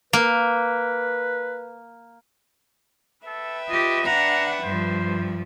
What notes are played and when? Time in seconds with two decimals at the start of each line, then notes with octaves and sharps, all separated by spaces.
0.13 A#3 B4
3.26 A4 B4 E5 G5
3.69 F4 G4 D#5
4.06 D4 F#5 A#5
4.63 G2 F3 C5